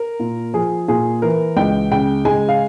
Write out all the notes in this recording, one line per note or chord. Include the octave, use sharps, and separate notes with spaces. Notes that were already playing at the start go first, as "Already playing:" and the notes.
Already playing: A#4
A#2
F3 G#4
A#2 G#4
E3 A#4
C#2 G5
C#3 G5
G#3 G#5
F5